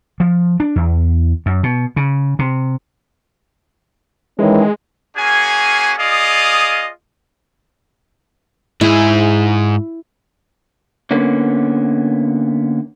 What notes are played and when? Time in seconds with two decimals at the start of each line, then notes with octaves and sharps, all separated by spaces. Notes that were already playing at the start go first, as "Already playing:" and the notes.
0.20 F3
0.60 D4
0.76 E2
1.46 F#2
1.63 B2
1.96 C#3
2.39 C3
4.39 D#3 E3 G#3 C#4
5.17 A#3 C#4 F#4 G#4 G#5
5.98 F4 G#4 D5 D#5 F5 D#6
8.81 G#2 E4 G#4
11.11 D3 A#3 B3 C#4